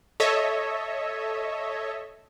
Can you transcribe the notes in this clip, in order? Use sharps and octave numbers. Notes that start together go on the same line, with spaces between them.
A4 C#5 D#5 E5